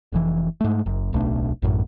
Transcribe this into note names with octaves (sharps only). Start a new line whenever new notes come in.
F1 F2 E3
G#2 A3
F#1 F#2
D1 B1 A3 D4
A1 F#2 A2